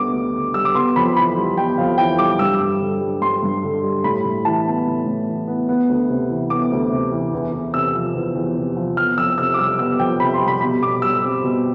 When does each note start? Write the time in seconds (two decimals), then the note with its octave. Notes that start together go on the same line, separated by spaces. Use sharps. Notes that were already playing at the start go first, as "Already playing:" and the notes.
Already playing: D2 D3 G3 B3 D6
0.13 D2
0.34 D3
0.54 G3 E6
0.65 D6
0.75 B3 C6
0.96 F2 B5
1.16 E3 B5
1.37 G3
1.57 B3 G5
1.78 F2 F5
1.98 E3 G5
2.18 G3 D6
2.39 G2 E6
2.60 G2
2.81 D3
3.00 G3
3.22 G2 C6
3.43 G2
3.63 D3
3.83 G3
4.04 A2 B5
4.25 A2
4.45 E3 A5
4.66 B3
4.86 A2
5.06 A2
5.28 E3
5.48 B3
5.69 B3
5.89 D2
6.09 C3
6.29 E3
6.50 B3 D6
6.72 D2
6.92 C3
7.12 E3
7.33 E2
7.53 E2
7.74 C3 E6
7.95 F3
8.15 E2
8.35 E2
8.56 C3
8.77 F3
8.97 B3 F6
9.17 F2 E6
9.38 C3 E6
9.54 D6
9.59 G3 E6
9.79 B3 E6
9.99 F2 G5
10.20 C3 B5
10.34 C6
10.42 G3
10.48 B5
10.61 B2 B5
10.81 B2 D6
11.02 G3 E6
11.23 C4
11.44 B2